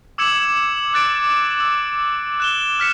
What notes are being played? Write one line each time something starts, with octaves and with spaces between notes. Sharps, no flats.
D6 E6 G#6 C#7 E7 F#7
D6 F#6 A6 D7
E6
F#6 E7 G7
F6 B6 C#7 E7